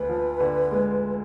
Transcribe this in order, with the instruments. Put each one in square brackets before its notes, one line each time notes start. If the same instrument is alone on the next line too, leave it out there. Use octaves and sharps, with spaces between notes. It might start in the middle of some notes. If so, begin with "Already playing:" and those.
Already playing: [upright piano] D2 [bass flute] B4
[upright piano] F3
D3
G#3